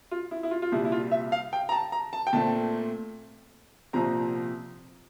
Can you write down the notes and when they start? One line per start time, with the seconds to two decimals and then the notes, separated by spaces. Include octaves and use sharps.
0.11 F4
0.31 E4
0.43 E4
0.51 F4
0.62 F4
0.72 C2 A#2 G3 E4
0.85 E4
0.92 F4
1.12 E5
1.32 F5
1.53 G5
1.69 A#5
1.72 A5
1.92 A#5
2.13 A5
2.27 G5
2.33 A#2 A3 C4 A5
3.93 C2 A#2 F3 C4 A#5